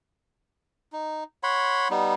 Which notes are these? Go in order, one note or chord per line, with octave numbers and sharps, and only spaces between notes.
D#4
C#5 F#5 B5 C6
G3 B3 D#4